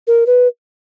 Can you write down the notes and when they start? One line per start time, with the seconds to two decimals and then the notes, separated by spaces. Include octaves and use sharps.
0.07 A#4
0.27 B4